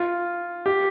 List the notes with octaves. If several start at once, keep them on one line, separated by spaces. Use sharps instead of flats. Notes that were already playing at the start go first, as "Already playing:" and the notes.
Already playing: F4
G4